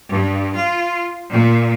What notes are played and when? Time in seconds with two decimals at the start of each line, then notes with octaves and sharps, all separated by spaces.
0.11 G2
0.56 F4
1.31 A#2